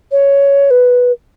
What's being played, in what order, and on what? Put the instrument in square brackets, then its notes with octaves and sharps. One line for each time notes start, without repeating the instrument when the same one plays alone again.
[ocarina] C#5
B4